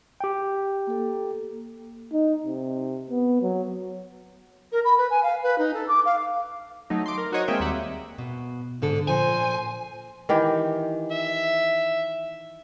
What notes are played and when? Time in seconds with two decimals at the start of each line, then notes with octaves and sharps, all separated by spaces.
0.20 G4 G5
0.87 A#3 A4
2.13 D#4
2.45 C3
3.10 B3
3.42 F#3
4.72 A#4
4.84 B5
4.98 B4
5.10 G#5
5.23 F5
5.42 B4
5.58 D#4
5.74 A4
5.88 D6
6.05 F5
6.90 F#3 A3 D#4
7.06 C6 D6
7.18 A#4
7.32 D#4 F#4 A#4 C5 C#5 D#5
7.48 G#3 A#3 C4 G#4 E5 G5
7.60 D#2 G3 E5 F#5 D6
8.18 B2
8.82 G#2 D3 A4
9.08 A#2 F3 C5 G#5
10.29 D#3 E3 G4
11.10 E5